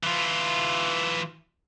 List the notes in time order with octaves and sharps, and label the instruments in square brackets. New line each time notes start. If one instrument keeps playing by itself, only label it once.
[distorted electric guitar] E3 F4